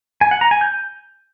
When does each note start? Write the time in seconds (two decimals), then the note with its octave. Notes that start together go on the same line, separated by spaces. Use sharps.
0.21 G#5
0.31 F#5
0.41 A#5
0.51 G#5
0.61 G6